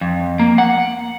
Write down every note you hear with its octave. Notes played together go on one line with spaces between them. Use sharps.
F2
A#3
F#5